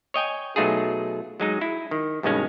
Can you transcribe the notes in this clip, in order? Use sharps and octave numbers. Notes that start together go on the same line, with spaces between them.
C#5 D#5 G5 G#5
B2 F#3 A3 D#4 F4 G#4
F#3 G#3 D#4
E4
D#3
G2 B2 D#3 G#3 C#4